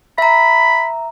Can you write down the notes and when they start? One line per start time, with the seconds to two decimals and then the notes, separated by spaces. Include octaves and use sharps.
0.18 E5 A#5 B5